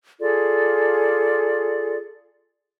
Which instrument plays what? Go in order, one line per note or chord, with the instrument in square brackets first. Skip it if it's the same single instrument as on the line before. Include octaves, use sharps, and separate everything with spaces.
[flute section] F4 G#4 A4 D5